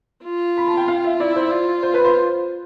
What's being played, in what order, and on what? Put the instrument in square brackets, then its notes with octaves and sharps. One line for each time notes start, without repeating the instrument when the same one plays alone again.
[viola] F4
[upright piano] B5
A5
G5
F5
E5
[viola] E4 [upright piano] D5
[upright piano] C5
[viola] F4
[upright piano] C5
B4
C5